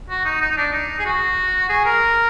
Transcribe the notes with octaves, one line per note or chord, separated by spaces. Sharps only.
F#4
D#4
D#4
D#4
D4
D#4
G#4
F#4
G#4
A#4